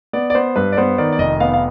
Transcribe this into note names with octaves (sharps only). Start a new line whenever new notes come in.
B3 D5
D5
B3 C5
G2 B4
D5
B3 C5
D#3 D5
D5
F1 D#5
B3 F5
F5